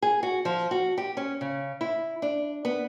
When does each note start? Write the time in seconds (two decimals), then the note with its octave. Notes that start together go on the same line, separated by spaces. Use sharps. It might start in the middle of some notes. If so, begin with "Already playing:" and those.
0.02 G#4
0.23 F#4
0.45 F3
0.71 F#4
0.98 G4
1.17 C#4
1.41 C#3
1.81 E4
2.22 D4
2.65 B3